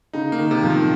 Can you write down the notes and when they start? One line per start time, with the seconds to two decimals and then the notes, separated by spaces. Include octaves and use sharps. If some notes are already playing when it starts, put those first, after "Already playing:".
0.13 C#3 D#4
0.32 A#3
0.38 D#3
0.51 C3
0.64 F3
0.70 D#3